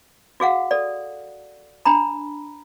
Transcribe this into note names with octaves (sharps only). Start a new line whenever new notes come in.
F#4 G#4 F5 F#5
A4 D5
D4 A#5 B5